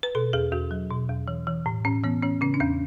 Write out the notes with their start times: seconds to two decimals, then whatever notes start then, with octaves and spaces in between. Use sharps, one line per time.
0.03 B4
0.15 B2 A4
0.33 E2 G#4
0.52 E2 F#4
0.71 F#3
0.90 B2
1.09 E2
1.28 E3
1.47 E3
1.66 A2
1.85 A2 C#4
2.03 E3 B3
2.22 E3 C#4
2.41 C#3 C#4
2.54 D4
2.60 E2 C#4